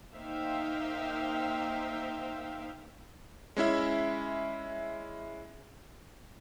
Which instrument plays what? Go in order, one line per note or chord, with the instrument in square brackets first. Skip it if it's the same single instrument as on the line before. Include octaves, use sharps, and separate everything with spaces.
[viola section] A#3 D#4 C5 E5 F5 G5
[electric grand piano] G#3 C#4 E4 E5